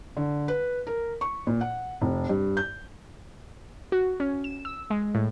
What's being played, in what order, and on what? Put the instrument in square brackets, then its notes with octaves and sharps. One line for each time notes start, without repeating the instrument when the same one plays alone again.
[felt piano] D3
B4
A#4
C#6
A#2
F#5
F1
G2
G6
[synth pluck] F#4
C#4
E7
E6
G#3
A2